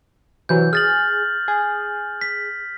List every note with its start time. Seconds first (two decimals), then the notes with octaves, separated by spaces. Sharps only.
0.49 C3 E3 F#3 G6
0.73 G#4 F6 A6 F#7
1.48 G#4
2.21 B6